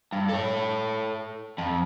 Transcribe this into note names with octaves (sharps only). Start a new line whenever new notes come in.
G2
A4 C#5
F2